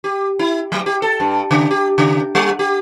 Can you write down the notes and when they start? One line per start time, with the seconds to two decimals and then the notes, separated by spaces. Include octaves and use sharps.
0.04 G4
0.39 E4
0.72 F#3
0.86 G4
1.02 A4
1.20 G2
1.51 C#3
1.71 G4
1.98 C#3
2.35 G3
2.59 G4